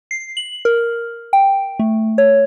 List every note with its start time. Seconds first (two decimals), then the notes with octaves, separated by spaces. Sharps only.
0.11 C7
0.37 F#7
0.65 A#4
1.33 G5
1.79 A3
2.18 C#5